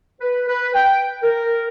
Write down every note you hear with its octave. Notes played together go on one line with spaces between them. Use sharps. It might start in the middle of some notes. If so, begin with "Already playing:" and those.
B4
B4
G5
A#4